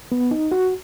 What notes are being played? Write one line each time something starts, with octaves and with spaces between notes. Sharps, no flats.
B3
D#4
F#4